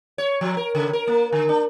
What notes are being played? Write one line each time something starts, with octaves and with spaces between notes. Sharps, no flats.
C#5
F3
A#4
C#3
A#4
A#3
D3
D4